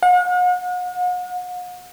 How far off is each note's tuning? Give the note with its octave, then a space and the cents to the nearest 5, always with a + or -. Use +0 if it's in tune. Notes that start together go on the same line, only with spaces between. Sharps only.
F#5 -45